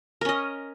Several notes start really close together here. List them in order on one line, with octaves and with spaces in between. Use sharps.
A#4 C#4 D#5